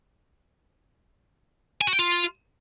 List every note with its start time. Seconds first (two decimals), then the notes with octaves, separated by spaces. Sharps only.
1.81 G#5
1.87 F#4
1.93 G5
1.99 F4